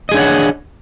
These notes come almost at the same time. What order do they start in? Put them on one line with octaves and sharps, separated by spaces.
D#5 G#4 D4 C#5 F#5